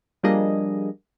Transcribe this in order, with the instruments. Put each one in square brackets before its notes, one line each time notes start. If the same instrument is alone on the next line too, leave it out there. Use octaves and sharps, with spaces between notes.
[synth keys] F3 G3 A#3 D4 G#4 D#5